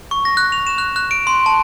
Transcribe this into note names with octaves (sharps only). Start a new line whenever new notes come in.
C#6
A#6
F#6
F7
E7
F#6
F#6
D7
C6
A5